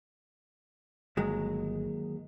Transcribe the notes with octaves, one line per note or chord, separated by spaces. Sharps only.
G1 D#2 F#3 G#3